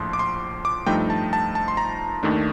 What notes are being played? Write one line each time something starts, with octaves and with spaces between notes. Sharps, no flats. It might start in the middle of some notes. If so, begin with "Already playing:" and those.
Already playing: A#1 A2 F3 C6
D6
C6
D6
G2 F3 A3 D#4 G5
A5
A5
A5
C6
A#5
D#2 D#3 A3 D4